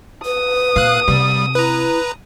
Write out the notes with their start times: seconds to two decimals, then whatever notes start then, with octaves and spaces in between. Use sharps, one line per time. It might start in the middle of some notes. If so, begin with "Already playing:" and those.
0.25 B4 D#6
0.76 A#2 F5 F#6
1.08 C3 G3
1.55 E4 B4 A#5